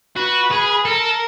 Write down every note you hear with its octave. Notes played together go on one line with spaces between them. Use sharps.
F#4 B4
G#4
A4 A#4